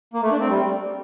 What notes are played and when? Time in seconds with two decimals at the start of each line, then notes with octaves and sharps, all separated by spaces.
0.14 A#3
0.22 A3
0.31 D4
0.40 C4
0.48 G3